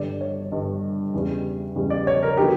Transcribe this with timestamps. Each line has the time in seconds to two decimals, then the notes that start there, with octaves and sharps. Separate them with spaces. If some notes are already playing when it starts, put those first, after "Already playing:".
Already playing: G1 G2 D3 D5
0.21 C#5
0.52 G1 G2 D3
1.14 E2 C#3 G3
1.76 E2 C#3 G3
1.90 D5
2.07 C#5
2.23 A#4
2.37 D3 F#3 B3 G4